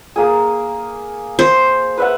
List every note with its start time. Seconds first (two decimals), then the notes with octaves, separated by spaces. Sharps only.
0.16 A#3 G#4
1.39 C5
1.98 B4 E5 F#5